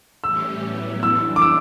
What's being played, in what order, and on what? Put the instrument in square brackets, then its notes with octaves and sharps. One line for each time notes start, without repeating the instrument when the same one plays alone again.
[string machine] A2 E3 G3 C#4 G4 [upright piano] E6
[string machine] A2 F#3 B3 E4
[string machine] E3 G3 D4 [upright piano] E6
[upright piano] D6
E6